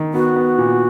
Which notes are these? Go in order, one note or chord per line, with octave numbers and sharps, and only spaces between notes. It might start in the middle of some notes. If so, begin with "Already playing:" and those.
Already playing: D#3
B3 F#4
B3
A#2